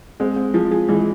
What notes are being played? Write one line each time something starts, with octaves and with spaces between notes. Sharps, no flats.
G#3 C4
C4
F3 G#4
G#4
E3 G#3